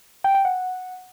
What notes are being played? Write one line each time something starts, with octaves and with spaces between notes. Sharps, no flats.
G5
G5
F#5